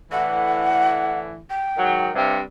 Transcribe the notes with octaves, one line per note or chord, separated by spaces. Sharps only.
A2 D3 E3 F#5
G5
G#2 D#3 F#3
G2 C3